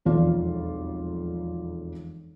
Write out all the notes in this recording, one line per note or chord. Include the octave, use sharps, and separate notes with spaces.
E1 B1 F2 F4 D5